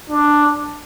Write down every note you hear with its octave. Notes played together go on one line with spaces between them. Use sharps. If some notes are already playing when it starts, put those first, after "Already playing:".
D4